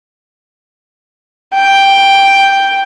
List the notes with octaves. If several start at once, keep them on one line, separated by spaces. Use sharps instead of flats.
G5